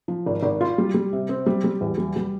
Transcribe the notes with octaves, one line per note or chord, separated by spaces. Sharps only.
F3
G#1
G#1
F4
G3
G3
C3
C4
G3
G3
E2
G3
G3